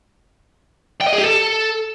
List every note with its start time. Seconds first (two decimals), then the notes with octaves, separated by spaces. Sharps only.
1.01 G5
1.07 D#5
1.13 G#4
1.19 G4
1.24 A4